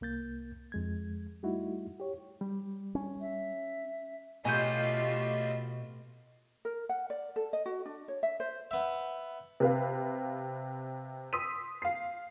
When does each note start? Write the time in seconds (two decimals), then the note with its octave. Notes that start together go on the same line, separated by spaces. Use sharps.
0.01 C2 A#3 G6 A6
0.72 F2 G#3 G#6
1.43 G3 A3 D#4 E4 F#4
2.00 G4 C#5
2.41 G3
2.95 C#4
3.21 E5
4.45 B2 A3 F4 G4 C#5 D#5 G#5 G6
6.65 A#4
6.89 F#5
7.10 D5
7.36 A4
7.53 D#5
7.66 F#4
7.85 D4
8.08 C#5
8.23 E5
8.40 C5
8.71 B3 E5
9.60 C3 B4 F5
11.33 C6 D#6 E6 B6 D#7
11.82 F5 C7